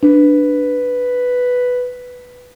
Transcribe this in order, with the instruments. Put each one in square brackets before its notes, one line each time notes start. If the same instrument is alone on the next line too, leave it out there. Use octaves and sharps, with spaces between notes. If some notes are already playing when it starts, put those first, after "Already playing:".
[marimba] D4 [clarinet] B4